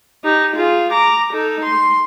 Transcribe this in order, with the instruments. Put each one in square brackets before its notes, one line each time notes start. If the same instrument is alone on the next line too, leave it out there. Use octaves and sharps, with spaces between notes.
[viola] D#4 G4
F4 G#4
A#5 D6
D#4 A4
C6